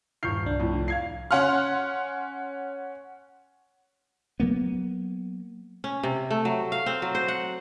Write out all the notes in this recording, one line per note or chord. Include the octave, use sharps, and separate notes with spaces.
D#1 G2 C#6 F6 G6 C7
C2 D4
F2 A2
F5 G#6 C7
C#4 F#5 C6 F6
F#3 A#3 B3
C#4
C3
A3
F#3
F5
C4
F#3
C5
F#5